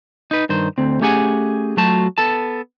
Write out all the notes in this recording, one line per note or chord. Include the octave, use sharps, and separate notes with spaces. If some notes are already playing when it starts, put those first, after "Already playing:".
D#4 B4
G2 D#3 C5
D2 C4
A3 C#4 G4 G#4 F#5 G#5
F#3 A3 F4 F#4 A5
B3 A4 A5